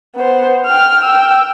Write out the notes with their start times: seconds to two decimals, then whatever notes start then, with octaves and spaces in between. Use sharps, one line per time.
0.15 B3 C5
0.66 G5 F6
1.04 G5 E6